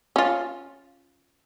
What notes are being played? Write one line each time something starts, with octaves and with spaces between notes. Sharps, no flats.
C#4 F4